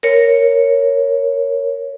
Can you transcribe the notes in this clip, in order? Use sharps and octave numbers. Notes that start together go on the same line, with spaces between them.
A#4 C#5